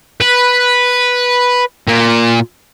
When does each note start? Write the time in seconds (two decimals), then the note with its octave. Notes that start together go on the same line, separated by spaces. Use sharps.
0.21 B4
1.88 A#2